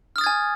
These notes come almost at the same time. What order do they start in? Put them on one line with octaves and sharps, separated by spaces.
F6 D#6 A6 G#6 G#5